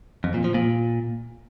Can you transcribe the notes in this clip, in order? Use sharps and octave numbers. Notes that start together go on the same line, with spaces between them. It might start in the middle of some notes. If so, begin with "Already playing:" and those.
F2
A#2
F3
A#2